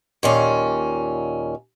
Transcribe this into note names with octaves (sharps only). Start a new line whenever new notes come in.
D#2 A#2 C#4